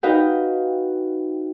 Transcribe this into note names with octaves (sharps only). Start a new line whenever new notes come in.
D#4 F#4 B4 F5 G5